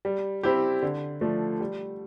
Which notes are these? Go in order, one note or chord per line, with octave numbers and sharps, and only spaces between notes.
G3
C4 E4 G4
D3
F3 A3 D4
G3